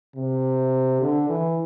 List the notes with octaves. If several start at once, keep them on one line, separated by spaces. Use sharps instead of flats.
C3
D3
E3